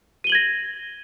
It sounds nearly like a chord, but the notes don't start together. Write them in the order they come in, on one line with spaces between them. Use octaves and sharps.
D#7 G7 F#7 G#6 A#6